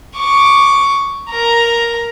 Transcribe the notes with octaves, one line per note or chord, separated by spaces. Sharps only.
C#6 D6
A#4 A#5